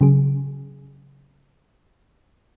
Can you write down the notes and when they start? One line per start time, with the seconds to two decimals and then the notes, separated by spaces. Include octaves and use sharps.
0.01 C#3 F#3 G#4